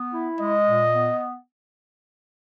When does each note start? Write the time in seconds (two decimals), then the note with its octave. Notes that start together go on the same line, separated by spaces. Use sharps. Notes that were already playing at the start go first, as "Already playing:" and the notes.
Already playing: B3
0.12 E4
0.39 G#3 D#5
0.67 A#2
0.95 B3